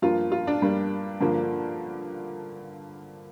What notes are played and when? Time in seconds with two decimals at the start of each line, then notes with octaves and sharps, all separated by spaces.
0.02 G2 F3 A#3 F4
0.32 F4
0.47 D4
0.62 G2 G3 A#3
1.21 G2 D3 F3 A#3